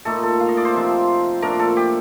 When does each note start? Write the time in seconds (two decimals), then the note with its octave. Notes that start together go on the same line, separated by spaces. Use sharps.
0.05 A#2 A3 D#4 A4
0.23 A4
0.40 F5
0.49 D#5
0.57 D5
0.65 C5
0.74 C3 F3 C4 D#4
1.42 A#2 A3 D4 A#4
1.59 A4
1.77 G4